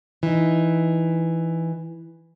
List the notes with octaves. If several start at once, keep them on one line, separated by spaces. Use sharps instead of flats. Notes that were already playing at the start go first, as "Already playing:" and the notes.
E3 D#4